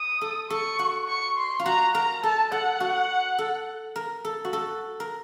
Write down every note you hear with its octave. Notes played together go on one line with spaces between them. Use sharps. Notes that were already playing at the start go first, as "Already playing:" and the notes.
Already playing: D#6
A4
A4 C#6
F#4
C#6
C6
F4
F#4 A#5
A#4 A#5
A4 A5
A4 F#5
F#4
A4
A#4
A4
F#4
A4
A#4